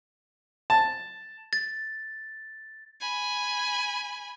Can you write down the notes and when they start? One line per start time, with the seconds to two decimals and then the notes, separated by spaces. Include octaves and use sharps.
0.70 A5
1.53 A6
3.01 G#5 B5